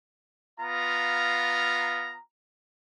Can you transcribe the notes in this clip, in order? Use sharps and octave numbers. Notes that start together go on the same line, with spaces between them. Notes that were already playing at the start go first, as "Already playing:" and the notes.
B3 F4 F5 A#5